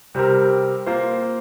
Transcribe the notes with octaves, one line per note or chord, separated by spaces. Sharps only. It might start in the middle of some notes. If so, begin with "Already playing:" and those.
C3 G3 C4 G4 A#4
A#3 F4 C5